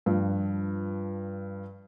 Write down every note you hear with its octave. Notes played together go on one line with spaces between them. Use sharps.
G2 F3